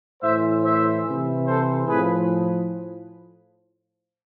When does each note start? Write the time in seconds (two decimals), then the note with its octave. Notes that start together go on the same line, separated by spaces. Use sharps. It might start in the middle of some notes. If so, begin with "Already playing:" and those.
0.21 A2 E3 C5 E5
0.63 C5 E5
1.04 C3 E3
1.46 A4 C5
1.87 A2 F3 G#4 B4